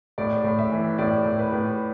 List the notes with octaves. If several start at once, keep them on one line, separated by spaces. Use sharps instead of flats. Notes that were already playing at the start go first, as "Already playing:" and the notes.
A2 D5
A2
E5
E3
A2 D5
A2
B4
A2